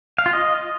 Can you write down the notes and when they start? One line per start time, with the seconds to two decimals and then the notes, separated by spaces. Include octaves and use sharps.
0.18 F5
0.26 F4
0.33 D#5